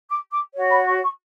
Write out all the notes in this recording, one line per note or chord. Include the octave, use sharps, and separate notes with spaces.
D6
D6
F#4 C#5
B5
C#6
C#6